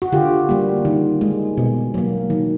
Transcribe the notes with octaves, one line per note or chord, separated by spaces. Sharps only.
F#4
D3 F4 G4
G3 A#3
D#3
G#3
B2
F#3 A#3
D#3